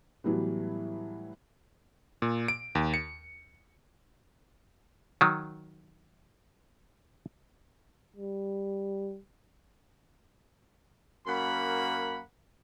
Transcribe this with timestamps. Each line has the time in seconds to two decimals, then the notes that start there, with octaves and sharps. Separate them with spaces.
0.24 A2 E3 F#3 G3 B3
2.22 A#2
2.48 D7
2.75 D#2
2.94 C#7
5.21 D#3 F#3
8.17 G3
11.26 F#2 A#3 F#5 B5